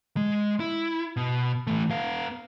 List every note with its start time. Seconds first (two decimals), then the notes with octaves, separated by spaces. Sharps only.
0.17 G#3
0.60 E4
1.17 B2
1.67 E3 A3
1.91 B3 F5